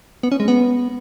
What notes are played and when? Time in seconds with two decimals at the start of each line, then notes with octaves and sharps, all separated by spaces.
0.23 B3
0.32 C#4
0.40 G#3
0.48 B3